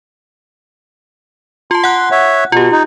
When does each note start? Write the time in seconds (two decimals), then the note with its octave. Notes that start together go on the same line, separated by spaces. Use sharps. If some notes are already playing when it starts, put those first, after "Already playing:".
1.71 F4 A5 C6
1.84 F#5 F#6
2.11 C#5 E5
2.52 B2 F4 G4
2.72 D#4